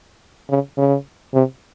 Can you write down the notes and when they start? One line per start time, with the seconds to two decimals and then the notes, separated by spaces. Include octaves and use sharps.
0.50 C#3
0.78 C#3
1.34 C3